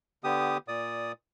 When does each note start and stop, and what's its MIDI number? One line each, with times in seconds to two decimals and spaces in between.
0.24 0.58 50
0.24 0.58 59
0.24 0.58 67
0.24 0.58 87
0.68 1.12 46
0.68 1.12 74
0.68 1.12 87